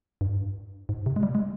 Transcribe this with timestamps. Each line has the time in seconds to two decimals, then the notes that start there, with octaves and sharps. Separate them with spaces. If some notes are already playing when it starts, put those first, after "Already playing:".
0.21 G2
0.89 G#2
1.06 C3
1.16 G#3
1.23 G3
1.35 G#3